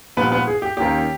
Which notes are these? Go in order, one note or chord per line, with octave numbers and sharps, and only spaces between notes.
A#1 A#2 G3 B3 B4
B3 B4
G#4
G4
D#2 D#3 A#3 C#4 G4